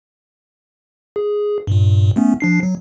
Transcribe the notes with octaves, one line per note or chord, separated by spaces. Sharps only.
G#4
G2 A#2
A3 B3 C#4
F3 D4 C7
F#3